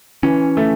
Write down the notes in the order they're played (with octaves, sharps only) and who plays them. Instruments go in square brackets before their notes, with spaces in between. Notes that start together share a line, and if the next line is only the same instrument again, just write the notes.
[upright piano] E3 [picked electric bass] C#4
[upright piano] A3